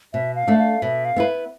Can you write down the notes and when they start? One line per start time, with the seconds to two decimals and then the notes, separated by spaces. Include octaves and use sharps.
0.13 B2 E5
0.35 F5
0.47 A3 D4 A4
0.59 F5
0.82 B2 E5
1.05 F5
1.16 B3 E4 B4